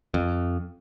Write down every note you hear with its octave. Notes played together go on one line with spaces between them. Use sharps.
F2